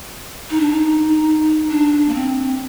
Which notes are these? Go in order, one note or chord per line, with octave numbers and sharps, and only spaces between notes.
D#4
D4
D#4
D4
A#3
C4